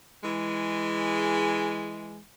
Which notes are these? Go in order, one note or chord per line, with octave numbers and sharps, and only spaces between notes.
E3 G#3